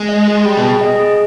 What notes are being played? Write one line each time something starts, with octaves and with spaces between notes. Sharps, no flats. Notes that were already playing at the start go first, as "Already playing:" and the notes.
Already playing: G#3
D#5
G#4
G3 G5
B2
G#4
D#5
G#4